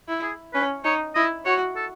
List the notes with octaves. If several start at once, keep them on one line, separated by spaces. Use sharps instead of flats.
E4
G#4
C#4 B4
D#4 C#5
E4 D#5
F#4 C#5
A4